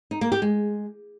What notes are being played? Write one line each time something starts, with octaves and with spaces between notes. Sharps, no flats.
D#4
A#3
G4
G#3